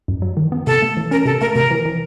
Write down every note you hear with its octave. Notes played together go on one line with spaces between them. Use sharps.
F#2
F#3
D#3
B3
C3 A4
A3
E3
C#4 A#4
C3 A4
A3 A#4
C3 A#4
E3
E3